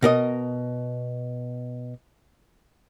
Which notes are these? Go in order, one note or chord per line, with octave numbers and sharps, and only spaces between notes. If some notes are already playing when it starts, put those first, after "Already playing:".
B2 A#4 D#5